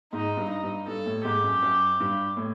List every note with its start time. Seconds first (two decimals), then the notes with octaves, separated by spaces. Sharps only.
0.13 G#2 D#4
0.37 G2
0.50 D#4
0.63 G2
0.88 G2 A4
1.06 A2
1.24 G#2 G4
1.44 F#2
1.62 F#2
2.00 G2
2.37 A2